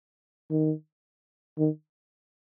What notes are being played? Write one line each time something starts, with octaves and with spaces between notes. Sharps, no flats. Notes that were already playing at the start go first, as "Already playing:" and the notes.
D#3
D#3